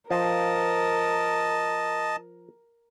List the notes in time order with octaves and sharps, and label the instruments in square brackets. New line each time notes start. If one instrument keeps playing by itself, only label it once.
[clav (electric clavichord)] F3 [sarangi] A#4 [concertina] D#5 A5